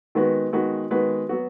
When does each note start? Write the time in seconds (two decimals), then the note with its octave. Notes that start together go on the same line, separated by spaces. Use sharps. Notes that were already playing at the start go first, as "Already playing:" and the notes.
0.15 D#3 G#3 B3 F#4 B4
0.53 D#3 G#3 B3 F#4 B4
0.91 D#3 G#3 B3 F#4 B4
1.29 F#3 B3 F#4